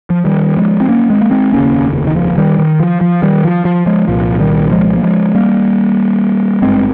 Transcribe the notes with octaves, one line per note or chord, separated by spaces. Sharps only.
F3
D#3 G3
F3 G#3
C4
A#3 C#4
G#3 C4
A#3
G#3 C4
F1 D#2 C#3 A#3 C#4
D#3
F3
D#3 G3
D#3
F3
F3
D#3 G3
F3
F3
F3 G#3
C2 A#2 F3
D#3 G3
F3 G#3
A#3
F3 G#3
G3 A#3
G#1 G2 G#3 C4